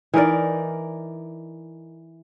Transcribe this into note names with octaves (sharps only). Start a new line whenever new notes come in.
E3 D#4 A#4 D5